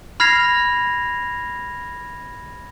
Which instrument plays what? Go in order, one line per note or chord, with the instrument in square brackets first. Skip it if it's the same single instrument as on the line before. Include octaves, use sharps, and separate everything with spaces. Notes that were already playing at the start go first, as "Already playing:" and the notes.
[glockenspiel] B5 F6 G#6 A#6 C7 F7